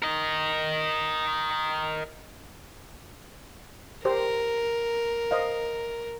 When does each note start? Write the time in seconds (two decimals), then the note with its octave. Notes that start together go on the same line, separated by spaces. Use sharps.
0.02 A#4 D#5
4.05 G4 A#4 C5
5.31 C5 D#5 F5